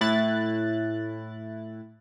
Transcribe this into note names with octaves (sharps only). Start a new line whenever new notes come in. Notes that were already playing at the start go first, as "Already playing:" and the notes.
A2 E4 F#6 A6